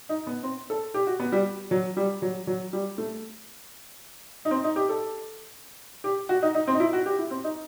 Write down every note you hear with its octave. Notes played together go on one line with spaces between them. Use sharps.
D#4
B3
C4
A4
G4
F#4
B3
G3
F#3
G3
F#3
F#3
G3
A3
D#4
C4
D#4
G4
A4
G4
F#4
D#4
D#4
C4
D#4
E4
F#4
G4
E4
C4
D#4